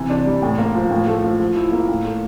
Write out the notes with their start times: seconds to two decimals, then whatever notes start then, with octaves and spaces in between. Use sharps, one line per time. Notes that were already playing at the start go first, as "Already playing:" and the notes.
Already playing: C3 E3
0.10 D4
0.26 G3
0.42 A2
0.58 A#3
0.75 F3
0.91 A2
1.07 A3
1.24 F3
1.40 F3
1.56 E4
1.72 A#3
1.89 A2
2.05 A3